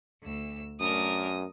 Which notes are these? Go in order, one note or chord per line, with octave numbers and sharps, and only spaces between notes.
D2 E6
F#2 A3 D4 A#4 D#6